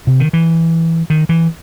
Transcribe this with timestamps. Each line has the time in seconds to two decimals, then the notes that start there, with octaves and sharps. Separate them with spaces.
0.07 C3
0.20 D#3
0.33 E3
1.10 D#3
1.29 E3